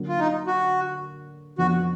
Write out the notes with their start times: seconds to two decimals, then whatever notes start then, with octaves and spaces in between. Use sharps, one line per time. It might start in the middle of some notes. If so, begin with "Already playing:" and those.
Already playing: D3 F#3 A#3
0.08 F4
0.19 D#4
0.47 F#4
1.58 F2 F3 B3 D4 F#4